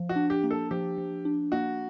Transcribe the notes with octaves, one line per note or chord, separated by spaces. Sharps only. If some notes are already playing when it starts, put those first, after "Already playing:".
Already playing: F3
F#4
D4
G4
A#3
A4
F3 G4
F3
D4
A#3 F#4